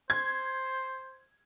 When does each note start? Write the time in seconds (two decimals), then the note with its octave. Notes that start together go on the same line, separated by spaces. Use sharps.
0.10 C5 G#6